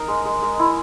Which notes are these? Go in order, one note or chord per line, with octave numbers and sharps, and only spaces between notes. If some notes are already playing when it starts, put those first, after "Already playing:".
Already playing: D#4 A#4
G#3
G#3
G#3
E4